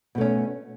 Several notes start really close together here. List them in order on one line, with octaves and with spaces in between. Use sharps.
B2 A3 C#4